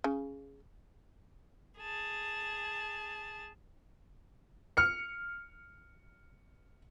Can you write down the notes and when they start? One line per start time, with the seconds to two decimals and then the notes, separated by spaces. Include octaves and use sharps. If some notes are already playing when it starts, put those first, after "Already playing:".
0.04 C#3
1.80 G#4 A5
4.77 F6 C#7